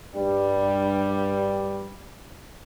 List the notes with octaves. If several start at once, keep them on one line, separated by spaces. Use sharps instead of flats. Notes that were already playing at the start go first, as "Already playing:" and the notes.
G2 G3